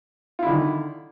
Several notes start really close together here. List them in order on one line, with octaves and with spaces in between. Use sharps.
F4 E4 D3 D#3